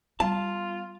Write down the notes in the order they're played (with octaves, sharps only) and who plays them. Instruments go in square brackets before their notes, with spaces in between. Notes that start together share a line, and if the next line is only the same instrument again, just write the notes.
[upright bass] G3 B3 [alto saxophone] F4 [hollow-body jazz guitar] A5